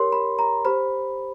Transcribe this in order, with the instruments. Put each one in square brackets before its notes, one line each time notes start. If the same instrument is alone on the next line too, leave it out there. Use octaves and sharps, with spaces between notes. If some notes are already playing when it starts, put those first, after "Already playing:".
Already playing: [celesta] G4 A#4 C#5 C6
B5
A#5
G4 C5 B5